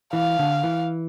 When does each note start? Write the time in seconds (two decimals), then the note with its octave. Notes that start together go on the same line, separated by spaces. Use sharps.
0.13 E3 F5
0.39 D3
0.64 E3